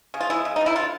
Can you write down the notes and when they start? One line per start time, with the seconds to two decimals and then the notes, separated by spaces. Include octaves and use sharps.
0.14 C#3
0.21 F4
0.30 G#3 E4
0.45 C#3
0.56 D#4
0.61 F3
0.66 E4
0.76 D3 F4